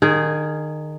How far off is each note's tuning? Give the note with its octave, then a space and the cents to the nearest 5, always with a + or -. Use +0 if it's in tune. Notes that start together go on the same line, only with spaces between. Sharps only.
D#3 -25 G#4 +0